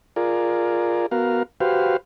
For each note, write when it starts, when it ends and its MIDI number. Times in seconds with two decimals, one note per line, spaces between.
0.16 1.06 65
0.16 1.06 68
0.16 1.06 70
0.16 1.06 74
1.11 1.43 59
1.11 1.43 66
1.11 1.43 70
1.11 1.43 77
1.60 1.97 66
1.60 1.97 67
1.60 1.97 71
1.60 1.97 72
1.60 1.97 77